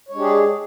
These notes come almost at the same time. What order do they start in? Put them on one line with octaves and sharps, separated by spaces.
C#5 G#3 D4 G4 G#4